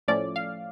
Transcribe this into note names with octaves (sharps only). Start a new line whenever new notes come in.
A2 F3 A3 C#4 D5
F5